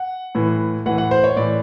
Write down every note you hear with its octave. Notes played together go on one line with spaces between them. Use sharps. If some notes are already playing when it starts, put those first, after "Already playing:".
Already playing: F#5
A2 E3
A2 E3 F#5
F#5
C5
C#5
A2 E3 D5